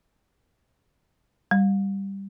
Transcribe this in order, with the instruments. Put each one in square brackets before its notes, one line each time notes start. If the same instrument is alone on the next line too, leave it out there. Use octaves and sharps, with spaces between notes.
[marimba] G3